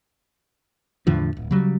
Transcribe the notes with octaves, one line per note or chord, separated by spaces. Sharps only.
E2 A2 D3 F3
D1
C#3 F#3 G3